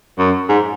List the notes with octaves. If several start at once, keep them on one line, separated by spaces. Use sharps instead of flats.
F#2
G#2